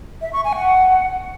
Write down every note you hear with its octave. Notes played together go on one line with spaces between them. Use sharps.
E5
C#6
G#5
F#5